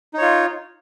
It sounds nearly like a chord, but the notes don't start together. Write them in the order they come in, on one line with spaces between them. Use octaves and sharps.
D#4 C#5 F4